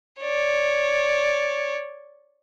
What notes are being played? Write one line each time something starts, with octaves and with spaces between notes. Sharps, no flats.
C#5 D5